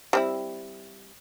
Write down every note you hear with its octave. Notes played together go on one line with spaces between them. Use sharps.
G3 C4 E4